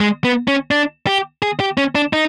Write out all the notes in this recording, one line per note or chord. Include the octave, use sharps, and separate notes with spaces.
G#3
B3
C#4
D4
G4
G#4
G4
C#4
D4
D#4